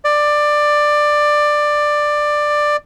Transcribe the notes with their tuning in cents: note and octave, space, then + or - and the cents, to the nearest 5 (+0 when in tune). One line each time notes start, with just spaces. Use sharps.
D5 +15